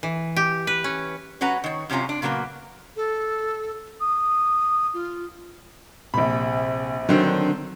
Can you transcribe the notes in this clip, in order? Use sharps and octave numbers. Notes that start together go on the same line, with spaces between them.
E3
G4
B4
C#4
F#3 C#4 B4 F#5 A#5
D#3 C#5
F#2 C3 C#4 F4 A#5
D4
A#2 C#3 F#3 A#3 B3
A4
D#6
F4
A#1 C3 B5
D3 D#3 F#3 C4 D4